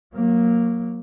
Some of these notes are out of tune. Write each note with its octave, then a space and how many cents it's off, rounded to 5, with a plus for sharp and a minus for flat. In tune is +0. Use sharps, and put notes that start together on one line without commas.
F#3 -25 A#3 +0